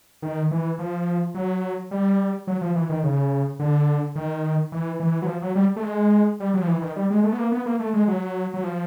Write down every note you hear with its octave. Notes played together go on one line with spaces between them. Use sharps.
D#3
E3
F3
F#3
G3
F#3
F3
E3
D#3
C#3
D3
D#3
E3
E3
F#3
F3
F#3
G3
A3
G#3
G3
F#3
F3
E3
D#3
G3
G#3
A3
B3
A#3
B3
A#3
A3
G#3
F#3
F#3
F3